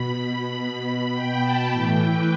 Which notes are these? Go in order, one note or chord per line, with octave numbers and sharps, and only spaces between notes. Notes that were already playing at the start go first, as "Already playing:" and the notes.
Already playing: B2 B5
B2
G5
A5
A2 E3 G5
B4